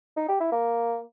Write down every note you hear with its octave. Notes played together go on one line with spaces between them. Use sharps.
D#4
G4
E4
A#3